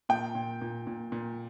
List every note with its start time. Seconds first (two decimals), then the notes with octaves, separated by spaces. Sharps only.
0.09 A#2 G5
0.35 A#2
0.61 A#2
0.87 A#2
1.12 A#2